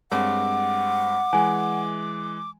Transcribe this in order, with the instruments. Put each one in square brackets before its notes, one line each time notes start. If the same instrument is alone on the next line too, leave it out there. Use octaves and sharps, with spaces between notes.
[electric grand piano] G2 G#3 C4 [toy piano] A#4 C#5 [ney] F#5 [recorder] D6
[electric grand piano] E3 G#3 [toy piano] G#5